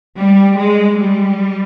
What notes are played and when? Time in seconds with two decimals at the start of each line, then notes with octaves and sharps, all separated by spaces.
0.17 G3
0.58 G#3
0.98 G3